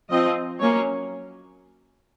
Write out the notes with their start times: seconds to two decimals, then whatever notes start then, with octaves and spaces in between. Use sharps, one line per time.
0.10 F3 C4 D#5
0.60 F#3 A#3 C#4 C#5